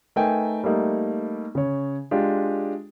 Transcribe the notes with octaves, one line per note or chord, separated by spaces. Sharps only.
A3 D#4 A#4 B4 G5 G#5
G3 A3 A#3 D#4
C#3 C#5
G#3 D4 F4 G4